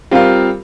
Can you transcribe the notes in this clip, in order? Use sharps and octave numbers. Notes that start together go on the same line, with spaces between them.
G3 C4 F4 A#4 F5